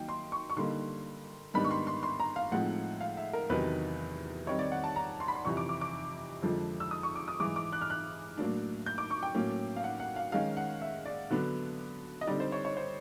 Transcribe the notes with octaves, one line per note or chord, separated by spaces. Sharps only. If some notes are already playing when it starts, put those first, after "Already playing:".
Already playing: D#3 F#3 A#3 D#4 G5
C6
C#6
C#6
D3 G3 A#3 D#4 C6
G#2 D#3 G3 B3 D4 B5
C#6
C6
C6
C6
A#5
F5
A2 F3 G#3 C4 D#4 F#5
F5
E5
A#4
E2 C3 D#3 F#3 B4
D#3 G3 C4 D#4 C#5
D5
F#5
A5
A#5
C6
B5
C6
F2 C3 E3 C#6
D6
D6
D6
F2 D3 F3 G#3
E6
D#6
C#6
D6
D#6
G#2 E3 G#3 D6
D6
F#6
F6
F#6
A2 F#3 A#3 D4
G6
D6
C#6
G5
A2 F#3 A#3 C#4
F5
F#5
F#5
F5
D#3 G#3 C#4 F5
F#5
E5
D5
D3 F#3 B3 D4
D#5
D3 G3 C4 D#4 D5
C5
C#5
C#5
C5